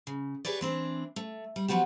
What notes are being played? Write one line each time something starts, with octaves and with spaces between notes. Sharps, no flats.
C#3
G4 G#4 B4 C#5 D5
E3 C4 D4
A3
G3
F3 F#3 B3 F#4 G4